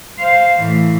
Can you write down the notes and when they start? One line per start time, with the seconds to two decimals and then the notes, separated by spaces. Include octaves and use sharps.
0.19 C5 F5
0.59 A2 E3